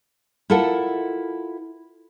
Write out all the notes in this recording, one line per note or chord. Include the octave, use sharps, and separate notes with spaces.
E4 F4 A4 A#4 F#5